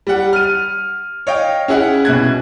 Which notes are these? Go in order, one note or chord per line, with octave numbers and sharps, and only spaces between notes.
G3 F#5
F6 D#7
C#5 D#5 F5 G5
C#4 E4 G#4 F#5
C2 B2 F#6 G#6